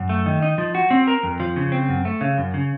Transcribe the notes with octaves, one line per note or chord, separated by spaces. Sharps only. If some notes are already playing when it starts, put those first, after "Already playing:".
Already playing: F#2
A3
D#3
D#4
F3
F#4
C4
A#4
F2
F3
C#3
C4
F#2
A3
C#3
F#2
C#3